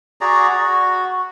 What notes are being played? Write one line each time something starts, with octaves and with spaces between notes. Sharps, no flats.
F#4 G#4 D5 A#5
F#4